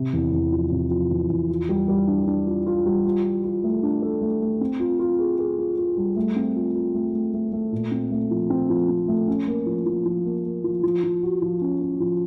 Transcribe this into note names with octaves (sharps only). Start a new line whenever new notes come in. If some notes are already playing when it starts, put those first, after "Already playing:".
Already playing: C3
E2
E2
F3
C3
F3
E2
E2
F4
G3
G3
D4
D4
F4
F4
G3
F4
F4
F4
A3
D4
A4
A3
A3
C4
F4
F4
G#4
G#4
F4
F4
G3
A3
C4
F4
F4
A3
A3
A3
A3
A#2
C4
A3
F3
C4
F3
C4
A3
C#4
A#3
F3
F3
F3
A#3
A#3
F3
F3
F3
F#4
F3
C#4
C#4
F3